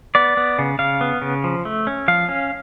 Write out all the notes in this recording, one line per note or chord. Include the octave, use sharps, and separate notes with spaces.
B3 D5
B3
C#3
C#3 F5
B3
C#3
F3
A3
C#4
F3 F5
C#4